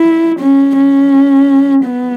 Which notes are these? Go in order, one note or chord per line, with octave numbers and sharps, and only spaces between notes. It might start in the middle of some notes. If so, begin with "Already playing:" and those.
Already playing: E4
C#4
C#4
B3